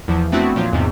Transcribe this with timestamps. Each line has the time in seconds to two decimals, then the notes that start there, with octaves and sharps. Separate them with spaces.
0.08 E2 E3 F3
0.32 A3 B3 C4 D4 E4 F#4
0.56 A#2 F3 F#3
0.73 E2 G#2 C3